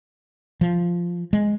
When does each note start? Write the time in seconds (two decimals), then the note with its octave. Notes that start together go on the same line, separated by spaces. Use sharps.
0.61 F3
1.33 G#3